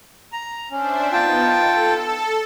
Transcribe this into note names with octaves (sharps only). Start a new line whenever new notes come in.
A#5
C#4 D4 C5 E5
B3 D#4 F4 G5 A5
A4